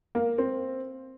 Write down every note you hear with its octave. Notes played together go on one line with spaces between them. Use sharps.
A#3
C4